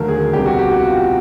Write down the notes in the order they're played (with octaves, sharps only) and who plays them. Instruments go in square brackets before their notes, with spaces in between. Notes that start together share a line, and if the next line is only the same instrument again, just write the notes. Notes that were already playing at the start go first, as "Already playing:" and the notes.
Already playing: [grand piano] D#2 D3 F#3 A3 A#4
G#4
C2 B2 G3 G4
F#4
G4
F#4
F4